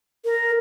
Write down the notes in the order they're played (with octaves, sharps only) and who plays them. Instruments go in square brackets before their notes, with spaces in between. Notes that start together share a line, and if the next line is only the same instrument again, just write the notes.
[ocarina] A#4